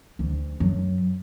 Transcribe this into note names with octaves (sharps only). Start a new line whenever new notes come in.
D2
F#2